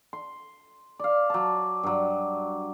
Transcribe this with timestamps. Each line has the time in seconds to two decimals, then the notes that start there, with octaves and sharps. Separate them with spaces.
0.13 C6
0.99 D5 F5
1.30 F#3 A5
1.83 G2 F#3